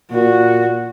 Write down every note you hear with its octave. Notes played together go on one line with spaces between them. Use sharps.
A#2 F#4